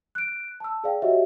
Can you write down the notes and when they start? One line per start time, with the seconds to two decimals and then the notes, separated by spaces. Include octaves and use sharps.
0.15 F#6 D7
0.60 A5 E6
0.84 G#4 D5 F5 G5
1.02 F#4 G4 C#5 D#5 E5 F#5